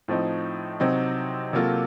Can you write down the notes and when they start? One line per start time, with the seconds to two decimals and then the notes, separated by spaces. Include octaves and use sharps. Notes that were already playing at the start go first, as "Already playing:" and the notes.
0.08 A2 F3 C4 D#4
0.80 C3 F#3 C4 D#4
1.53 C3 F#3 A#3 F4 A4